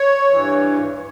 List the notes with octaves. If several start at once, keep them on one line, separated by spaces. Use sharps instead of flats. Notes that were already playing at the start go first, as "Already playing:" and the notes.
Already playing: C#5
G2 E3